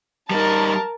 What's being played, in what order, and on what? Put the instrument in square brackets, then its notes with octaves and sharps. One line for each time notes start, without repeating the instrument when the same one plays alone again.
[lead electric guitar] G3 D#4 [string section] A#4 A5